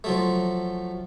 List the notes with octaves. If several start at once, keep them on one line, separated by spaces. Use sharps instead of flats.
F3 F#3 A3